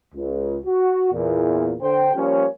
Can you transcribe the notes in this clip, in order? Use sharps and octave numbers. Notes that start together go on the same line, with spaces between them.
C#2
F#4
E2 A#2
D3 C5 G5
F3 G3 A#3 C#4